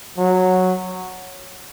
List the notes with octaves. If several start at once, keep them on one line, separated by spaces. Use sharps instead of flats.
F#3